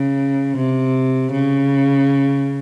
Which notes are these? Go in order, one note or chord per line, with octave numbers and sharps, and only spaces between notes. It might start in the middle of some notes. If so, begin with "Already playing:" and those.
Already playing: C#3
C3
C#3